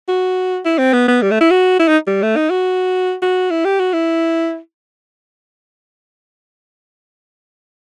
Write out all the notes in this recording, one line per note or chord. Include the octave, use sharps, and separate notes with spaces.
F#4
E4
C4
B3
B3
G3
A3
E4
F#4
E4
D#4
G3
A3
D#4
F#4
F#4
E4
G4
F#4
E4